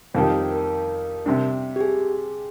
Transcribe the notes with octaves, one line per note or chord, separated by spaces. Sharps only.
F2 D#3 G3 C5
A#4
A#4
C3 G3 D4
G4
G#4